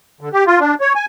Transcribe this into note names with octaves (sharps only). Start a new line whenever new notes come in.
D3
G4
F4
D4
C#5
G#5